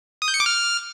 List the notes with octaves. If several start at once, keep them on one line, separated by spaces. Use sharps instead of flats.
D#6
G6
C#7
D6
F6